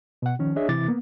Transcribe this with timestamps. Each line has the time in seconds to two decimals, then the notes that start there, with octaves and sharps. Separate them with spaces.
0.22 B2 F#5
0.39 D#3 F3 C#4
0.56 D4 G#4 C#5 D#5 E5
0.69 C3 E3 E4 D6 A6
0.88 A#3 B3